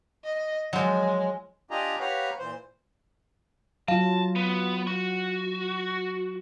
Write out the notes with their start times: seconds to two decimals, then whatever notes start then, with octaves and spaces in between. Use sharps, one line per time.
0.24 D#5
0.73 F3 F#3 G#3
1.71 D4 F4 G4 D#5 G#5 A#5
2.00 G4 B4 C#5 F5 F#5 A#5
2.39 A#2 E3 C5
3.88 F#3 F4 F5 A5
4.36 B3
4.87 F#4